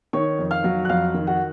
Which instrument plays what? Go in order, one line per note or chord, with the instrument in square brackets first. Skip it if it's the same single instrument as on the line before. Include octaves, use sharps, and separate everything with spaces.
[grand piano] D#3 C#5 C#6
F2
F5 F6
F#3
F#6
F2 F5 F6
D#3
F#4 F#5